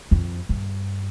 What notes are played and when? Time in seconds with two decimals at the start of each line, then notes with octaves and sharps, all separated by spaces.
0.11 F2
0.49 G2